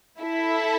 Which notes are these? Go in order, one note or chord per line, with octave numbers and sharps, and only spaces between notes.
E4 A4 E5